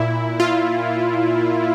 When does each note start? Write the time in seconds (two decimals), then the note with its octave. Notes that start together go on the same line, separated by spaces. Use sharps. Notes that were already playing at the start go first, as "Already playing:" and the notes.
Already playing: A#2 E4
0.40 F4